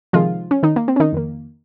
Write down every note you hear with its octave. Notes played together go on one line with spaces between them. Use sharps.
C3 D#3 F3 G#3 F4
C#4
D#3 D#4
A#3
C4
C#4
D#3 D#4
F2 D#3 A#3